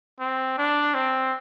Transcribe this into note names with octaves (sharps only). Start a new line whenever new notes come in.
C4
D4
C4